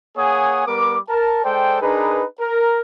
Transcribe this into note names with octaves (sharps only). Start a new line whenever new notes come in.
A#3 G#4 C#5 F#5 G#5 D#6
G3 B3 A#4 D6
A#4 A5
G#3 A4 C5 D5 G5
D4 D#4 G#4 A#4 B4
A#4